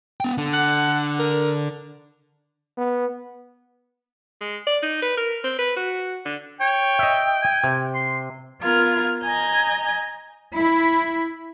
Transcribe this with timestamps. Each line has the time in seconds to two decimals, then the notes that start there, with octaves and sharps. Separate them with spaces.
0.21 B3 G5
0.38 D3
0.53 F#5
1.19 A#4
2.77 B3
4.41 G#3
4.67 D5
4.82 D#4
5.02 B4
5.17 A#4
5.44 C4
5.59 B4
5.76 F#4
6.25 D3
6.60 C#5 G5
6.99 D#5 E5
7.42 G#5
7.64 C3
7.94 C6
8.62 B3 F4 A#4 F6 G#6
9.22 D#5 G#5 A#5 G6 G#6
10.55 E4